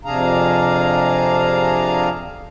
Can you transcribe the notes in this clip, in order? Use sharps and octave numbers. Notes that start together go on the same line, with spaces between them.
F2 C3 D4 G#4 F5 A#5